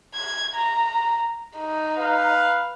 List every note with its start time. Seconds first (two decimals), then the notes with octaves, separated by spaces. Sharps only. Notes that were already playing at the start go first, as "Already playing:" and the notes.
0.14 G#6
0.55 A#5
1.58 D#4
1.98 B4 F5